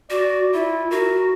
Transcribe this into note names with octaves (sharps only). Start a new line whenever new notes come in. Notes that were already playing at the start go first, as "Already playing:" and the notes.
F#4 D5
E4 F4
F#4 A#4